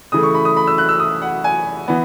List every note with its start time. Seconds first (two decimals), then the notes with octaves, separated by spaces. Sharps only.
0.12 C#3 E3 A3 D#6
0.23 C#6
0.34 B5
0.45 D#6
0.56 B5
0.67 E6
0.78 F#6
0.89 E6
1.00 D#6
1.22 F#5
1.44 G#5
1.88 E3 B3